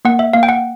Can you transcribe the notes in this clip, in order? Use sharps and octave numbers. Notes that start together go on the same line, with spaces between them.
A#3 F#5
E5
A#3 F5
G5
F#5